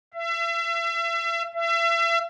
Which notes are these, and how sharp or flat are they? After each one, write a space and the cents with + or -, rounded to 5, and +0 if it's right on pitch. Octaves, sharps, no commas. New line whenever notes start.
E5 +35
E5 +35